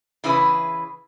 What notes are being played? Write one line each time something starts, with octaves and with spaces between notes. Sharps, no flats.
C#3 E3 E4 G#4 B4